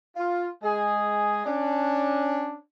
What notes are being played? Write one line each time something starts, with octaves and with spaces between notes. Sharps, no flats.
F4
G#3 G#4
C#4 D4